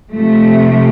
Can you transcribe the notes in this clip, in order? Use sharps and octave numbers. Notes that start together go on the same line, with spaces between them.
C3 F3 A3